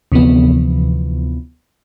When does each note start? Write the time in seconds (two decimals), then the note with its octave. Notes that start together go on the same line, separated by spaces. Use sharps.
0.12 D2 C3 E3 F3 B3